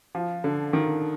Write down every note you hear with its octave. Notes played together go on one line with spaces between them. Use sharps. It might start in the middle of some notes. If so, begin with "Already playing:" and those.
F3
D3
D#3